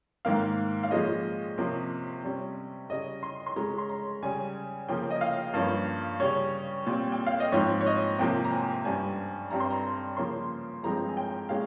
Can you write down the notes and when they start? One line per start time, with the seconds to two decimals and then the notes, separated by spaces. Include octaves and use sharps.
0.25 G#2 D#3 A#3 F5
0.83 F5
0.91 A#2 F3 G#3 C#4 D#5
1.58 C3 F3 A#3 C#4
2.23 C3 G3 C#4
2.90 C#3 G3 C#4 D#5
3.23 C6
3.46 C6
3.56 C#3 G#3 C#4 A#5
3.78 C6
3.89 A#5
4.22 C#3 G3 C#4 G#5
4.89 C#3 F3 A#3 G5
5.10 D#5
5.21 F5
5.54 G2 F3 A#3 C#4 F5
6.20 C#3 G3 C#4 C#5
6.86 A#2 G3 C4
7.12 G5
7.26 F5
7.40 D#5
7.52 G#2 F3 C4 C#5
7.81 C#5
7.86 D#5
8.18 F2 C3 F3 A#3 G5
8.45 A#5
8.52 G#5
8.85 G2 G3 C#4 G#5
9.51 G2 G3 C4 A#5
9.60 C6
9.70 A#5
10.17 C#3 F3 A#3 C#4 C6
10.83 G2 F3 G#3 C4 A#5
11.09 G#5
11.17 G5
11.49 A#2 G#3 C#4 F5